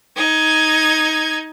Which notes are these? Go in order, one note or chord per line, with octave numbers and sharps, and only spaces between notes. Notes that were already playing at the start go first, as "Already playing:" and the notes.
D#4 G#6